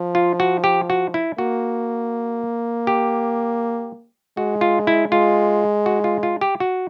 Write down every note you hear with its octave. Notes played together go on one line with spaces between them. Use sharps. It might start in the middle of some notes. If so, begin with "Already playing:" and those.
Already playing: F3
F4
F#4
G4
F#4
E4
A#3 F#4
G4
G#3 F#4
F4
E4
G#3 F4
F#4
F4
F4
G4
F#4